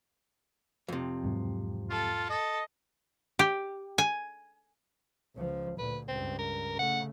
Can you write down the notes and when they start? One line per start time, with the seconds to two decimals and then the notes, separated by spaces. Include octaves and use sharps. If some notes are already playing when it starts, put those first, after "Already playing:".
0.88 F2 C3
1.23 E1 G#2 F#3
1.90 F4 A4
2.30 A4 D#5
3.39 G4
3.98 G#5
5.36 C#2 F3
5.78 D2 A#2 B4
6.08 C#2 G2 C4
6.39 A#4
6.79 C#3 A3 F#5